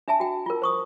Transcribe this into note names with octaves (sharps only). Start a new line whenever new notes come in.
D4 E5 G#5 A5
F#4 G5
F4 A#4
C5 C#6 D#6